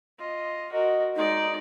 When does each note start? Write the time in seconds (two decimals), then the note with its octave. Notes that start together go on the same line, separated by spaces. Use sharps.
0.19 F4 D#5
0.72 F#4 A#4 D#5
1.15 G#3 D#4 D5